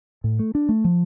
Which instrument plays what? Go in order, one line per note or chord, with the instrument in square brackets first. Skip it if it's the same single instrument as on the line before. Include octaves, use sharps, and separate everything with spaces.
[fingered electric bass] A2
A3
D4
A3
F3